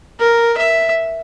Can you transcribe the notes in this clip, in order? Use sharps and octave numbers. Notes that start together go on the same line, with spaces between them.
A#4
E5